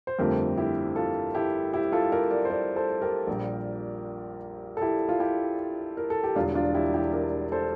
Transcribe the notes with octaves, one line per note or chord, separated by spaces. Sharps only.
C5
G1 F2 D3 A3 C4 G4 A#4
E4 G4
F4 A4
E4 G4
E4 G4
F4 A4
G4 A#4
A#4 D5
C5
A#4 D5
A4 C5
G4 A#4
A#1 A#2 G3
A4
E4 G4
F4
E4 G4
A#4
A4
G4
E1 E2 D3 G3 D4 F4
D4 F4
E4 G4
E4 G4
G4 A#4
A4 C5